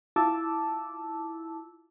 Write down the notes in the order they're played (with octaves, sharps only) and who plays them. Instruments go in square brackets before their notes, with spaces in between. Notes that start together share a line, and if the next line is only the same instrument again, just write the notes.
[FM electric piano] E4 F4 A5 D6 E6